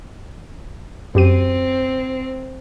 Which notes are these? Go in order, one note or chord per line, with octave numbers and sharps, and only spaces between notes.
F#2 C4 G4 D#7